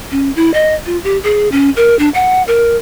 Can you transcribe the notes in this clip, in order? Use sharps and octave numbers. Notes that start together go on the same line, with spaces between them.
C#4
E4
D#5
F4
G4
G#4
C#4
A#4
D4
F#5
A#4